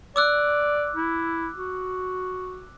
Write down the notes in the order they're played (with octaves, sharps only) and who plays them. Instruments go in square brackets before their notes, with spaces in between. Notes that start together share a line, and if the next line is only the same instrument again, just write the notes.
[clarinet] D5 [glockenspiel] D6 E6 F#6
[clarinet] E4
F#4